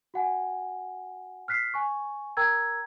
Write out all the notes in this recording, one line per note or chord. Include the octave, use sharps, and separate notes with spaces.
F#4 F#5 G#5
F6 F#6 B6 C7
G#5 C#6
A#4 G5 A#5 E6 G#6